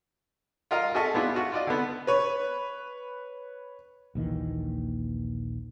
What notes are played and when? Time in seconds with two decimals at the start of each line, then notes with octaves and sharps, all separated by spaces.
0.71 F4 A#4 D#5 F5 A#5
0.95 F#4 G#4 A4 D#5 E5 A5
1.14 G#3 B3 D4 E4 F4 G#4
1.34 F4 F#4
1.52 F4 D5 D#5
1.67 D3 B3
2.07 B4 C#5
4.15 A#1 D#2 D#3 E3